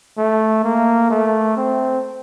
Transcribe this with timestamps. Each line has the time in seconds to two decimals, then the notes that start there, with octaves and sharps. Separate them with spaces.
0.18 A3
0.64 A#3
1.10 A3
1.57 C4